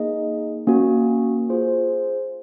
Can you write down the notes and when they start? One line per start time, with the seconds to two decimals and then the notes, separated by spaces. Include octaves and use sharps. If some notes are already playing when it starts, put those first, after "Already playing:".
Already playing: A#3 D#4 G#4 D#5
0.67 A#3 C#4 F#4
1.49 F4 G#4 C5